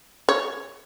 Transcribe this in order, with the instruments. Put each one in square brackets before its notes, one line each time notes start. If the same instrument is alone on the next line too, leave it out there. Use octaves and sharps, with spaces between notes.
[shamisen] C#5